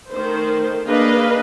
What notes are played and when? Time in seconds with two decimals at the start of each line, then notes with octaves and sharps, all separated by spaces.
0.12 D#3 A3 C5
0.87 A#3 D4 G#4 B4 D#5 F5